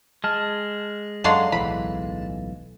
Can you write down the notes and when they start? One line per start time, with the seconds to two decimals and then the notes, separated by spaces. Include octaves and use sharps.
0.24 G#3 A5 F6
1.24 F#2 F#3 D4 A4 D#5 F5 C6
1.52 D1 B1 E3 B5